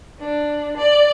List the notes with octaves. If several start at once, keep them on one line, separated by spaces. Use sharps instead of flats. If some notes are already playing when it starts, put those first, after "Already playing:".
D4
D5